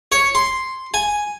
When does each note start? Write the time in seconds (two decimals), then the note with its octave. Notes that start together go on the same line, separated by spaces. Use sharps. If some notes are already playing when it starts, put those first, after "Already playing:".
0.12 C#5
0.35 C6
0.94 G#5